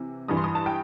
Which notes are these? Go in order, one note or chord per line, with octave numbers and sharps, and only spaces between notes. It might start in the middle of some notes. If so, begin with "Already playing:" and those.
Already playing: C3 E3
G2 E3 D#6
C6
D#6
A5
G5